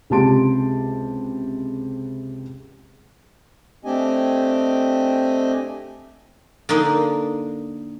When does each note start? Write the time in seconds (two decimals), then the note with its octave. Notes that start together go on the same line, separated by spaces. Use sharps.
0.10 C#2 C3 G4 A5 C6 D7
3.85 A3 C4 D4 G4 D#5 G#5
6.69 D3 A#3 D#4 C6